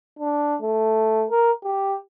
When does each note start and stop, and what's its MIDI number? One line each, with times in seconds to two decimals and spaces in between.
0.19 0.57 62
0.62 1.26 57
1.31 1.52 70
1.64 1.97 67